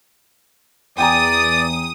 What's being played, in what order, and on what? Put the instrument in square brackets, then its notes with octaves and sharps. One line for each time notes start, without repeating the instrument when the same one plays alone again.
[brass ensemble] E2 [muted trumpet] D5 [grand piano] G5 G#5 A#5 [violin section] D#6